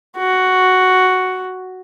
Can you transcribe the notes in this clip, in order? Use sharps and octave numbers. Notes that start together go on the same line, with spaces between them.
F#4